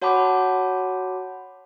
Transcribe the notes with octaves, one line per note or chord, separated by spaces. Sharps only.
F#4 C#5 F#5 A5 B5 D6